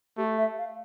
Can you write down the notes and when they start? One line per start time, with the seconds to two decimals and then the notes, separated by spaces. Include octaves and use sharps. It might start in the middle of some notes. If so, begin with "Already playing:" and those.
0.17 A3 G4
0.38 E5
0.58 F5